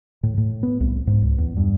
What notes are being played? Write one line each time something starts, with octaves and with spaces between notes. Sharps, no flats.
A2
A2
B3
C2
G#2
C#2
E2
G2